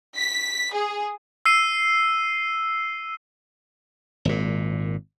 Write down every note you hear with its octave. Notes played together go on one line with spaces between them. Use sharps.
B6
G#4
E6 C7 D#7
G#1 A#2